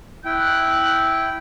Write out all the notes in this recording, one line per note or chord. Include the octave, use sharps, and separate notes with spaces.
E4 G5 F#6